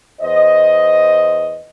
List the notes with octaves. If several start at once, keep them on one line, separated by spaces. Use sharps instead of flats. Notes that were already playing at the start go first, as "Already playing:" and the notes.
E2 C5 D#5